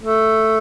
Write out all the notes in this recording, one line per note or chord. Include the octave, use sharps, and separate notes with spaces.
A3